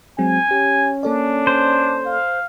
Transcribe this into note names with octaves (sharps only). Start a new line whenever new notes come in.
F#3 G#3 C4 G#5
C#4 G4
A#3 D4 A4 D5
C5
F5